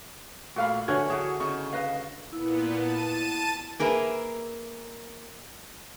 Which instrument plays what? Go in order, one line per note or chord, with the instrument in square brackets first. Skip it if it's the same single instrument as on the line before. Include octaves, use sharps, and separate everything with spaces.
[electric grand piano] A#2 A3 F6 [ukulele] F#4 F5 B5
[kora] D3 F#4 [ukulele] B4 C#5 E5 [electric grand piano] G#5 F6 G#6
[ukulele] E4 F#4 [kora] G#4 [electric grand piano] C#5
[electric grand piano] C#3 C#6 [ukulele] D#4 E4
[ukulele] B4 D#5 F5
[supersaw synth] A#2 B3 [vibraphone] E4
[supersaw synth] A5 D#7
[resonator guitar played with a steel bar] A#3 G#4 A#4 B4 E5